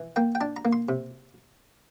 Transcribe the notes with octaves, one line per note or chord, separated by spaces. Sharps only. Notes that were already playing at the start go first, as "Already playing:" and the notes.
Already playing: E3
A#3 G5
G5
D4 A5
A#5
A#3
C6
C3